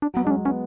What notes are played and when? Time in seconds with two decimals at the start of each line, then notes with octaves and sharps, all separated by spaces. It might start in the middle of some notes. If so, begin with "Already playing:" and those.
0.02 D4
0.14 F#3 B3
0.24 G#3 D4
0.31 C#4
0.35 G#3
0.45 B3 C#4